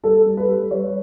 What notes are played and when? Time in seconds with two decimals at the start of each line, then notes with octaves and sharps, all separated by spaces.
0.03 G3 A4
0.26 G3
0.37 B4
0.49 G3
0.71 G3 C#5